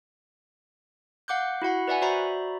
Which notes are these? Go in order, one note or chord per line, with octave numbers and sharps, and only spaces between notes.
F5 F#5 D6 F#6 G6
E4 F#4 F#5 B5
B4 D5 E5 F#5 G#5
F#4 C5 D5 E5 A#5 B5